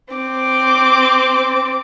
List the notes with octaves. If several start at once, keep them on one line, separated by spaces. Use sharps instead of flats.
C4 D6